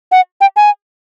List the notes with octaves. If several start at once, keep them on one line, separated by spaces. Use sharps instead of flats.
F#5
G5
G#5